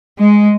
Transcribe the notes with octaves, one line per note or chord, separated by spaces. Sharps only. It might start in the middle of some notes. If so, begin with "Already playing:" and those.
G#3